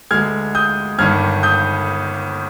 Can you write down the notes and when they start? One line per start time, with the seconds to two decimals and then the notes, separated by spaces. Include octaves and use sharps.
0.11 D2 D3 G#3 F6 G#6
0.55 D#6 G6
0.99 G1 G2 D#3 G3 F6 G#6
1.43 D#6 G6